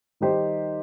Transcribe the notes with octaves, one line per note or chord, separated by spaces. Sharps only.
D#3 G3 D#4 G4 C5